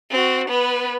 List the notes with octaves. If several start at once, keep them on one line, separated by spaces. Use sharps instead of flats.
C4 F#4
B3 B4